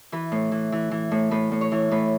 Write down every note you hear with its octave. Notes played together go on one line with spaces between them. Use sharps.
E3 B4
A2
E3
E3
E3
A2
A2 B4
A2
C#5
E3
A2 B4